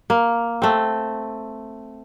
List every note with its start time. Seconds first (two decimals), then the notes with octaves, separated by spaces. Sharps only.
0.10 A#3
0.62 A3 C4